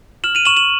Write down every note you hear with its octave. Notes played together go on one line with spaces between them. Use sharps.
F6 E7 F#7
D#7 F7
C#6 E7 F#7
E7 F#7